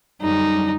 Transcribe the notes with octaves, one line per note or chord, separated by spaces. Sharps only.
F#2 D3 G3 D#4